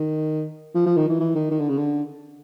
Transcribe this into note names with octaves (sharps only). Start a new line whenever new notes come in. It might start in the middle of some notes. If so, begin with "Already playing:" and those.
Already playing: D#3
F3
F3
D#3
E3
E3
D#3
D#3
D3
C#3
D3